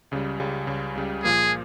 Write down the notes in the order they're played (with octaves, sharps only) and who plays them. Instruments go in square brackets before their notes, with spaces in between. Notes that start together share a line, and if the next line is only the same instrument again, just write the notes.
[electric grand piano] C#2 C#3 G3
C#2 C#3 G3
C#2 C#3 G3
C#2 C#3 G3
[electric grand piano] A#2 F3 A#3 [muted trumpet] G#4